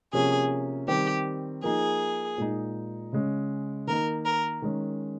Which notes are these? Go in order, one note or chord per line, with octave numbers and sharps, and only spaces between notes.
C3 F3 A#3 C#4 G#4
D#3 G3 C4 G4
F3 A#3 D#4 G#4
A#2 G#3 D#4
C#3 G#3 C#4
D#3 A#3 D#4 A#4
A#4
D#3 G#3 C#4